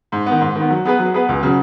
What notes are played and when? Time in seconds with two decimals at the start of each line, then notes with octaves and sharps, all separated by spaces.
0.12 G#2
0.26 B3
0.32 D#3
0.41 G#2
0.55 D#3 B3
0.71 F#3
0.85 B3 G#4 B4
0.99 F#3
1.14 B3 G#4 B4
1.29 C#2
1.43 C#3 F#3